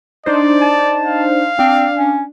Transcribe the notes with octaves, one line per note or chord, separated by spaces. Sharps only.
D4 D#4 C5 D5
A5
F5
C4 D4
C#4